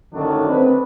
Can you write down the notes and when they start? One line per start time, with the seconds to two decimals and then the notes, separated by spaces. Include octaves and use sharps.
0.13 F#2 A2 D3 D#3 F#3 D4
0.47 C4 B4